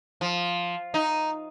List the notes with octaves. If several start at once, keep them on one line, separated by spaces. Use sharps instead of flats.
F3
D#4